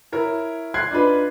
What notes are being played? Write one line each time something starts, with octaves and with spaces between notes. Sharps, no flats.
E4 A#4 C#5
C6 F#6 G#6 C7
D4 D#4 F4 B4